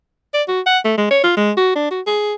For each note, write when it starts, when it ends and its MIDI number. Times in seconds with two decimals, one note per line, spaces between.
0.34 0.43 74
0.48 0.60 66
0.66 0.79 78
0.85 0.93 57
0.98 1.07 56
1.11 1.20 73
1.24 1.33 65
1.37 1.52 56
1.57 1.71 66
1.76 1.90 62
1.91 2.01 66
2.07 2.34 68